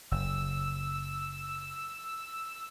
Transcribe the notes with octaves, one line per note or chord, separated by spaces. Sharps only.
F#1 E6